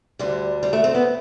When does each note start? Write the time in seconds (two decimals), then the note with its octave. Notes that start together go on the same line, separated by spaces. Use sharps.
0.19 D2 D3 G3
0.63 G3
0.73 A3
0.84 C4
0.95 B3